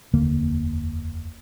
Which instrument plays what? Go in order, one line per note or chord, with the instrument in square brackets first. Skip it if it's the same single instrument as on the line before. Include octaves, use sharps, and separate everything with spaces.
[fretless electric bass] F1 D#2 D3 A#3